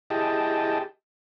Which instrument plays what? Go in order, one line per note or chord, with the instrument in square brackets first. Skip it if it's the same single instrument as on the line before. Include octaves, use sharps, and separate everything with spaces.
[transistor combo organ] E4 G4 G#4 D#5 G5 A5